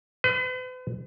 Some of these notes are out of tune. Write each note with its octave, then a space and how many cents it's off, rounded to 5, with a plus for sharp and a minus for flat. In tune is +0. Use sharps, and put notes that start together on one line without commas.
B4 +45